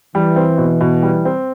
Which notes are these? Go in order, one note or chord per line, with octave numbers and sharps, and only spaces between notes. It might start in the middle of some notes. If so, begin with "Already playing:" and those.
E3 G3
C4
B2
B2
G3
C4